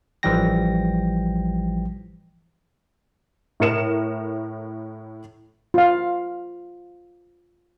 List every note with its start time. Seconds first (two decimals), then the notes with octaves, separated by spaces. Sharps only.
0.23 A1 E3 F3 G3 G5 A#6
3.60 A2 A#4 C#7 E7
5.74 F4 F5